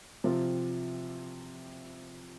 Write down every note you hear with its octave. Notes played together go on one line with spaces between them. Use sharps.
C3 F3 C4 F4